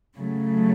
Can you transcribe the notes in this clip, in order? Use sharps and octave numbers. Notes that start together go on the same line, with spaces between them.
C#3 F#3 A3